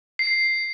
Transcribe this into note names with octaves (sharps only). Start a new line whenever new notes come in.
C7